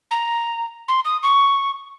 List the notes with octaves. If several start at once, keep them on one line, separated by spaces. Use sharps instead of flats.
A#5
C6
D#6
C#6